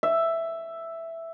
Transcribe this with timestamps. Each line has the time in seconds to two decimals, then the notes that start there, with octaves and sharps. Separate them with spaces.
0.03 E5